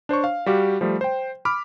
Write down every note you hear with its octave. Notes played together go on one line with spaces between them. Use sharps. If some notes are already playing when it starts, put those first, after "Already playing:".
D4 C5 C#5 C#6
F5
G3 F#4 G4 F5
F3 G3 A3
C5 G5
B5 D6 F6